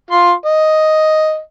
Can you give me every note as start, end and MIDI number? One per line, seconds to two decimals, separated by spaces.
0.11 0.32 65
0.11 0.32 84
0.45 1.39 75